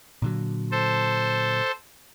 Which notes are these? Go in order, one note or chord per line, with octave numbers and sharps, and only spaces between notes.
A#2 D3 F#3
A4 C5